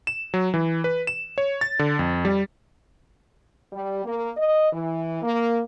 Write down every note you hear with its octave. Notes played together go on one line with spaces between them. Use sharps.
E7
F#3
E3
B4
E7
C#5
A6
D3
F2
G3
G3
A#3
D#5
E3
A#3